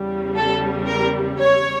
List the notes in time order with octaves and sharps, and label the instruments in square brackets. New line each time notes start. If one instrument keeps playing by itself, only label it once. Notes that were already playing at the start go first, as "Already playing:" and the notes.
Already playing: [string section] E2 C#3 G3
A4
A#4
C#5